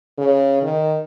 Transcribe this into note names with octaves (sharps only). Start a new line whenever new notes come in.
C#3
D#3